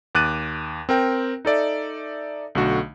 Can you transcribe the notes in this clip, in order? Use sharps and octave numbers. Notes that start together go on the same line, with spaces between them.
D#2 D6 F#6 A6 D#7
C4 A#4 G5
D#4 A4 D5 E5
B1 D3 A3 F#4